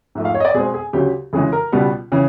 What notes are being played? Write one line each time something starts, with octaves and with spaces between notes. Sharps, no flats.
G#2 F3 A3 E5
F5
C#5
D#5
D5
B2 G#3 C4 G#4
G#4
D2 C#3 F#3 G4
D2 C#3 E3 G#3 G#4
A#4
C#2 B2 G3 B3
C#3 E3